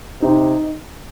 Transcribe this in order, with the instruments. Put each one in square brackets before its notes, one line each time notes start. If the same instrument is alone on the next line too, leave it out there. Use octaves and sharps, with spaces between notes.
[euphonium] C3 [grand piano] D#4